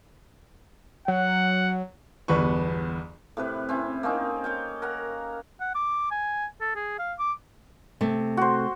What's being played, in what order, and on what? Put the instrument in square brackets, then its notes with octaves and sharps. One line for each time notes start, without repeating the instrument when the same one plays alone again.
[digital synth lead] F#3 [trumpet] F#5
[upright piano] G1 E2 B4 C#6
[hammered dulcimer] A2 C3 B4
C4 C#4 E4
A#3 C4 C#4 D#4
C#5 F5 G5
A#4 F#5 A#5
[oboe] F#5
D6
G#5
A4
G#4
F5
D6
[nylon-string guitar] C3 A3
[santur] F#4 C5